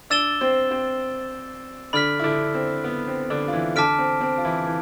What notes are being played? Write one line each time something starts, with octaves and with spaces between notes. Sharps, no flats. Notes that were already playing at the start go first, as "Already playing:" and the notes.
D4 D5 E6 A6 E7 G7
C4 C5
C4 C5
D3 D4 B5 F6 B6
E4
D3 D4
C4
B3
C4
D3 D4
F4
E3 E4
D3 D4 A5 D6 F6 B6 D7
C4
C4
F4
E3 E4
E3